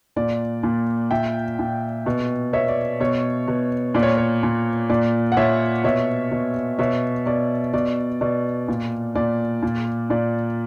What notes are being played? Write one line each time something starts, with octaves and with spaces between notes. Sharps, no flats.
A#2 D5
A#2
A#2 E5 G5
A#2
B2
B2 C#5 E5
D5
B2 C#5
B2
A#2 D5
C#5
C#5
A#2
A#2 D5
F#5
A#2 C#5 E5
B2 C#5 E5
B2
B2 C#5 E5
B2 D5
B2 D5
B2 D5
A#2
A#2 D5
A#2
A#2 D5